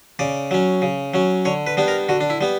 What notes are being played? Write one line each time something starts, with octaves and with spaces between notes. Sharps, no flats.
C#3 D5
F#3 C#4
C#3
F#3 C#4
D3 C#5
B4
G3 B3 D4
A#4
D3 F#4
D4
E4
G3 B3